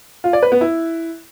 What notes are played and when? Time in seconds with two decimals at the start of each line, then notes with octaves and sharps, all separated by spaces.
0.24 F4
0.33 D5
0.43 B4
0.52 B3
0.61 E4